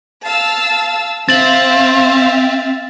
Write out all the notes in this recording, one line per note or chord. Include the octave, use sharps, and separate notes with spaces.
F5 A5 E6
C4 E5 F5 A6 F#7